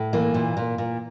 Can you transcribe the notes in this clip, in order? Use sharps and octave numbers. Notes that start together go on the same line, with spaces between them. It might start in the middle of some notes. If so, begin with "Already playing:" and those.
Already playing: A2
E3 A#3
A#2
A#2
A#2